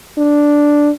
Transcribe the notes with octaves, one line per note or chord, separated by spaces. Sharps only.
D4